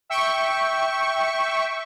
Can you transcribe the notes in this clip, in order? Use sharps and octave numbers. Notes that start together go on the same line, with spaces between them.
E5 G5 C#6